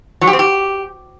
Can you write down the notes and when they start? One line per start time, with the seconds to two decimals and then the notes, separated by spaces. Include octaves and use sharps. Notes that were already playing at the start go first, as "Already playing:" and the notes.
0.21 F#3
0.27 G4
0.33 C4
0.39 G4